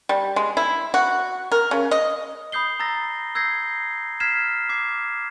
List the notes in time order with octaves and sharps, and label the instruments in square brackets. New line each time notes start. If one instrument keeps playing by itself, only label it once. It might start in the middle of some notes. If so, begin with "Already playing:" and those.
[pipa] G3
G#3
E4
F#4
A#4
C#3
D#5
[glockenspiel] B5 D#6 G6 C7 G7
A#5 E6 A6 A#6
E6 G6 G#6 A#6 C7
F6 G#6 B6 C7 E7
D6 G#6 C7